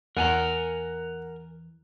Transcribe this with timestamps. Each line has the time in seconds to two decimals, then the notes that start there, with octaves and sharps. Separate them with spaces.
0.17 E2 A#4 F#5 G#5 A#5